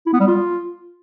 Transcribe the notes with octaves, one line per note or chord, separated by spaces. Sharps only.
E4
B3
G3
F4